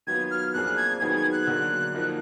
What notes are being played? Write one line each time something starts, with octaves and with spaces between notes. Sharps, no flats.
D#3 F#3 B3 F4 G#6
F6
F2 F3 A#3 D4 G#4 F#6
G#6
D#3 F#3 B3 D#4 G#4 G#6
G#6
F#6
D3 F#3 A#3
F3 A#3 D#4